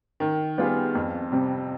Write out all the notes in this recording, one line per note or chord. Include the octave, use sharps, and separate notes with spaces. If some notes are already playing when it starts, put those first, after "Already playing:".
D#3
G3 B3 F4 G#4
F2
C3 G3